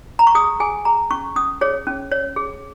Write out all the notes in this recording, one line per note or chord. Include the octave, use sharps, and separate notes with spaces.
A#5
C#6
G#4 D#6
G#4 G#5
G#4 A#5
C#4 C#6
C#4 D#6
G#4 C#5
C#4
C#5
G#4